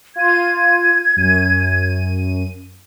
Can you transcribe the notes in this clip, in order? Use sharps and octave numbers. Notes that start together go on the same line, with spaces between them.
F4 G#6 D#7
F#2 D#7